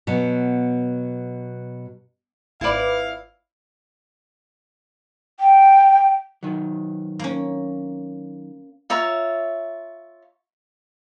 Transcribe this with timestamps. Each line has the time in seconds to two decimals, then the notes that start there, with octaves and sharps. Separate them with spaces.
0.07 B2 F#3
2.61 G#1 E4 B4 D5 F5
5.40 G5
6.43 D#3 F#3
7.19 A#3 C#4
8.90 F4 C#5 E5 A#5